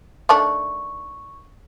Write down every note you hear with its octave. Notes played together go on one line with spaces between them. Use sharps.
D#3 A3 D4 C#6